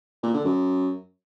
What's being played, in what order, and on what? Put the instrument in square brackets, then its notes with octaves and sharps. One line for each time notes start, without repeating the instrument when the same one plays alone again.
[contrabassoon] A#2
D3
F#2